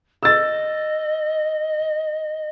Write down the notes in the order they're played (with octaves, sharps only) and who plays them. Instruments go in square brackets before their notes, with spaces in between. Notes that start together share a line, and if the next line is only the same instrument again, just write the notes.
[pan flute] D#5 [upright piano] E6 A6